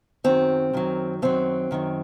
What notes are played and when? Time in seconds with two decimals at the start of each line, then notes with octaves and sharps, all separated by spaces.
0.24 F#2 D#3 F#3 C4
0.73 F#2 D#3 F#3
1.22 F#2 D#3 F#3 C4
1.71 F#2 D#3 F#3